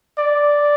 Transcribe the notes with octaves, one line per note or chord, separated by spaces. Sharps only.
D5